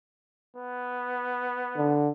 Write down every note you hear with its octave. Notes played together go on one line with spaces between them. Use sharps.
B3
D3